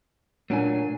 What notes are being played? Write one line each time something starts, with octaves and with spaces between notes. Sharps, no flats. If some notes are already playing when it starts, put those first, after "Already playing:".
A#2 F#3 A3 D4 G#5